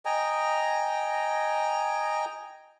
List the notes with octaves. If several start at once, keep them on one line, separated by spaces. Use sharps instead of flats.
D#5 G5 G#5 A#5